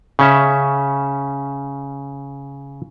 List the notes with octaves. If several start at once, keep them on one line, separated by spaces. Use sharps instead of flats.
C#3 C#4 E5